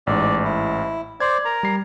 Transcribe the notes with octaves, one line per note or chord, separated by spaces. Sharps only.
A1 G#2 D5
E4
C5 D5 G#6
A#4 A#5
G3 C7